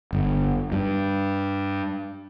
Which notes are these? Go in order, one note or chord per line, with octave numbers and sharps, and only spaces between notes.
G1
G2